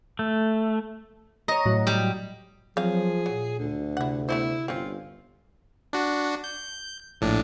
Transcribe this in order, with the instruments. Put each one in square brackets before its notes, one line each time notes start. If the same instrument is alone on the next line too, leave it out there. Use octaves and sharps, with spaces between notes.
[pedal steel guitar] A3
[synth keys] C#5 A#5 [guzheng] D#5
[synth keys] A2 F#3
[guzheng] G3
[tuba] F3 [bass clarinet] F#3 [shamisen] C4 F5 [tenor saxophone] G#4
[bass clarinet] A#2 [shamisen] F#3
[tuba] D2 [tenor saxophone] D3
[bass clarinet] C3 [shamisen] E4 F#5
[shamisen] A3 B3 C5 [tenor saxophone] E4
[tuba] G1 [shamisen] C4 C#4 [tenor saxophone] F4
[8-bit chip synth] D4 F#4
G6
A#1 A2 D4